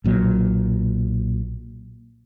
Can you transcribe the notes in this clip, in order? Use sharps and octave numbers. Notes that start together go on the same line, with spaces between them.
B1 A#2 F#3